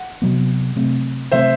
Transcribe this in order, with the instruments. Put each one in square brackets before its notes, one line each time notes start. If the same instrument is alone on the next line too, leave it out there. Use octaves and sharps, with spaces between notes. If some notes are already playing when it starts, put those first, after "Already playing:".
Already playing: [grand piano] F#5
[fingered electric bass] C3 F#3 B3
C3 F#3 A3 C4
[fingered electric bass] C3 F#3 A3 C4 [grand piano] C5 E5